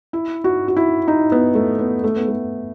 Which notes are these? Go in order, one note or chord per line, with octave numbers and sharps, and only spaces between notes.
E4
F#4
F#4
E4
D#4
B3
A3
B3
A3
B3
A3